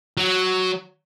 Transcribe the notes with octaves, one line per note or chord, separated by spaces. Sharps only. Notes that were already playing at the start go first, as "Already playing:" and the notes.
F#3